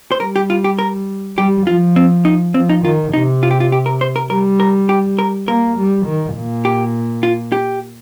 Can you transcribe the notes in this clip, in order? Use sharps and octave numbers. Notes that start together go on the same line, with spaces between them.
C5
G3 A#4
G4
F4
G4
A#4
G3 G4
F3 F4
C4
D#4
F3 C4
D#4
D#3 F4
C3 D#4
F4
G4
F4
G4
A#4
C5
A#4
G3 A#4
A#4
G4
A#4
A#3 A#4
G3
D#3
A#2
G4
F4
G4